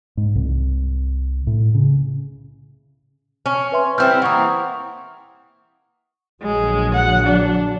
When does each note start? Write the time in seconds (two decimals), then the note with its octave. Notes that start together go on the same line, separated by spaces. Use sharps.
0.17 G#2
0.35 C2
1.47 A2
1.74 C#3
3.46 C#4
3.72 B4 E5 C6
3.98 G3 C4 E4 F6 G6
4.22 E3 A#3 F#5 C#6 D#6
6.42 A#1 D3 F#3 G#3
6.94 F#5
7.26 D4